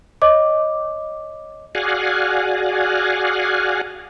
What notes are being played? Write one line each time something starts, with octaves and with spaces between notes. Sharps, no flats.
C#5 D#5 D6
F#4 G#4 D5 F5 F#5 G#5